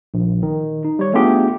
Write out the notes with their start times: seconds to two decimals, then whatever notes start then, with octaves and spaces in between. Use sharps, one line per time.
0.14 A#1
0.43 D#3
0.85 D#4
0.99 G3 C#5
1.14 A3 B3 D4 F4 G4 G#4